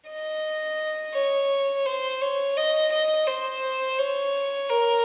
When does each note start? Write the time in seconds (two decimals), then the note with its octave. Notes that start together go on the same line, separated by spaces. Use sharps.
0.09 D#5
1.14 C#5
1.86 C5
2.21 C#5
2.57 D#5
2.91 D#5
3.27 C5
3.99 C#5
4.70 A#4